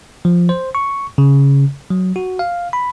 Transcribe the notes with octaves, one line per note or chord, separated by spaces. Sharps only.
F3
C5
C#6
C#3
F#3
F#4
F5
B5